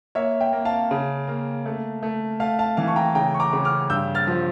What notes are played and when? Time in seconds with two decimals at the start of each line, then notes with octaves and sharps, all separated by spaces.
0.15 A#3 C#5 E5
0.40 E5 G5
0.53 A#3
0.65 F5 A5
0.91 C#3
1.28 A#3
1.66 A3
2.03 A3
2.40 A3 F5 A5
2.59 F5 A5
2.77 E3 F5 A5
2.88 C#6
2.96 G5 A#5
3.15 C#3 G5 A#5
3.34 C#6
3.40 A#5 D6
3.53 C#3
3.65 D6 F6
3.90 G2 E6 G6
4.15 F6 A6
4.27 F3